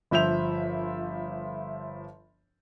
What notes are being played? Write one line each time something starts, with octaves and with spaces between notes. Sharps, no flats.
G1 F3 E5 G6 F7